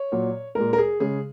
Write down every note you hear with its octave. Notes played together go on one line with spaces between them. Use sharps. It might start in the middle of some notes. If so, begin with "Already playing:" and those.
Already playing: C#5
A#2 F#3
A#2 G#3 A#4
A#4
G#4
C#3 G#3 G#4